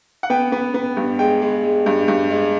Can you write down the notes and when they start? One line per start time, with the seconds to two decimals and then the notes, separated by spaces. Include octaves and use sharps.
0.23 F#5
0.30 B3 G5
0.52 B3
0.74 B3
0.97 G2
1.19 G#3 G5
1.42 G#3
1.64 G#3
1.86 G2
2.08 G2
2.31 G#3